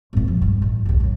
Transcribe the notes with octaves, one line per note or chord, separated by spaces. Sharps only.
G#1 A#2
F3
G2
A1
A#1 D#2
F#2 A2